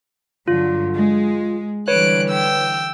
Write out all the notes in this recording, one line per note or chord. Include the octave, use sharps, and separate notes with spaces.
G2 D3 F#3 F4
G#3
D3 E3 G3 B4 C#5 F#6 D7
G5 E6